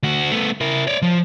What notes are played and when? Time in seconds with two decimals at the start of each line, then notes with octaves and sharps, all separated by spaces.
0.03 D2 F#4
0.31 A3 B3
0.61 E4 A#4
0.87 C#5 D5
1.02 F3